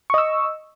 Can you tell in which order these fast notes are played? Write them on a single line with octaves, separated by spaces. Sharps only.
C#6 D#5 E6